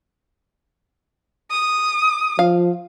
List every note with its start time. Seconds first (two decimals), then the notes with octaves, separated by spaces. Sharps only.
1.51 D#6
2.39 F3 F5